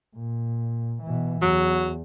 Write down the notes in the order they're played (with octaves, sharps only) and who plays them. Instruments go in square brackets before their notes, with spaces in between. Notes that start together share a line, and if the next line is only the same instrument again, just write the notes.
[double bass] A#2
B2 E3
[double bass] E2 [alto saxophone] F#3